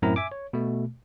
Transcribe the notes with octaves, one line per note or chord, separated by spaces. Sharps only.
F#2 A2 C4 E4 A#4 A#5
E5 G#5 D6
C#5
B2 A3